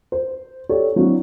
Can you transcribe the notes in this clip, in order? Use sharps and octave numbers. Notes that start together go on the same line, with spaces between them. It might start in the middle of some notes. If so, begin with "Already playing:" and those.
C5
G4 A4 C#5 D5
F#3 C4 D4 E4 F#4